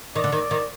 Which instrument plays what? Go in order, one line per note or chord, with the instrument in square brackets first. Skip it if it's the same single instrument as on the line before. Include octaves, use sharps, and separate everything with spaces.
[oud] D#3 [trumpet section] D5
[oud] D3
D#3
D#3